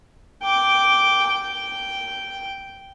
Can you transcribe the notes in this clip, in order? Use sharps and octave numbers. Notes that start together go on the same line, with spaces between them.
G5 D6
G5